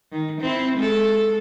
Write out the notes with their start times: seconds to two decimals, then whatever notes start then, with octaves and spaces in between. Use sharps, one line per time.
0.12 D#3
0.41 C4 E4
0.77 G#3 A4